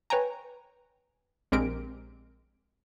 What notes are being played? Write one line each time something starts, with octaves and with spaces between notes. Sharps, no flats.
B4 C#5 G5 G#5 A#5
A#1 G#3 C4 G4 A#4 D7